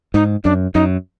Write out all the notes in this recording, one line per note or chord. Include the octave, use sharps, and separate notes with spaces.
G#2 D#4
F#2 D4
F#2 D#4